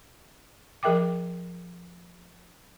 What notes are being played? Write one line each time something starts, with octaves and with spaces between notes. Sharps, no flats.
F3 G#4 A#4 E5 G5 D6